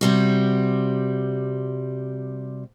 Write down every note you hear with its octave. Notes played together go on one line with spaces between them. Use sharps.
C3 G3 F#4